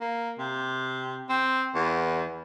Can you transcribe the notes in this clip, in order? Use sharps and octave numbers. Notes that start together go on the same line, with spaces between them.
A#3
C3
C4
E2